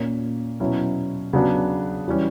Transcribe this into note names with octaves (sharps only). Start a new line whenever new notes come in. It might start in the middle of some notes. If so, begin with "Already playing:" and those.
Already playing: A#2 A#3 C#4
B2 F#3 C#4 E4
C#3 F#3 B3 D4 F#4
E3 G3 C#4